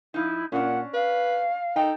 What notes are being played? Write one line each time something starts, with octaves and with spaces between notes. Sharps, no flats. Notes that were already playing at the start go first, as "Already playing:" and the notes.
F3 D#4 E4
A#2 C#4 D4 F#5
B4 F5
D#4 A4 G5